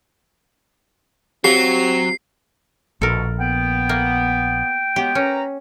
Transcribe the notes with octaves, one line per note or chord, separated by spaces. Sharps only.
F#3 C4 G4 F5 C7
A#1 B2 A4 A#4
B3 G5
A#3
F#3 G#3 B3 G4
C#4 A#4 B4 A#5